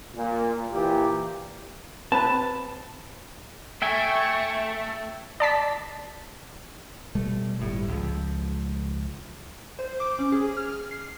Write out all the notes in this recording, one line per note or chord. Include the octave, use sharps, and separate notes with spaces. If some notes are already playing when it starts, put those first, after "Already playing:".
A#2
A#2 E3 G4
C4 B4 A5
A3 E5 G5 G#5 C#6
D5 A5 B6
B2 G3 A3
G1 A2 G3
C#2 F3
C5
D6
C#4
G#4
F6
C7